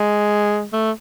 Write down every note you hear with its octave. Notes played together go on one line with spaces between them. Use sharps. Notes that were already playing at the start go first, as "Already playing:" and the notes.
Already playing: G#3
A3